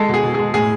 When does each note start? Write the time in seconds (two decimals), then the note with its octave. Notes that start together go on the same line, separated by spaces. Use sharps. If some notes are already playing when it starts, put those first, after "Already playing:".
Already playing: G#3 A4
0.09 B2 G#4
0.24 B2
0.34 G#3 G#4
0.54 A2 G#4